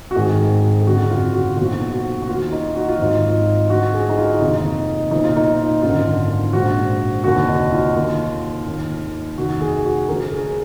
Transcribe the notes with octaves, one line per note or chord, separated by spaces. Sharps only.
F#4
G#1 G#2 D#3 G#4
G#4
F#1 F2 D3 F#4
F4
F#4
B1 A#2 F3 F#4
F#4
F#4
D#2 D#3 F4
D#4
F#4
F4
G#1 G#2 F3 D#4
F4
D2 D3 F3 F#4
G#4
D#4
F4
F1 D#2 D#3 D#4
B1 A#2 F3 D#4
F4
D#4
G#1 F#2 D3 F4
A#1 G#2 F3 F#4
F1 D#2 D3 F#4
D#4
F4
D#2 D#3
D#2 D#3
F1 D#2 D#3 F#4
G#4
F#4
D2 D3 F3 A#4
G#4